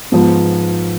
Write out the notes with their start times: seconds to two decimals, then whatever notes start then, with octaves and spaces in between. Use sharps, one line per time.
0.12 G#2 F3 B3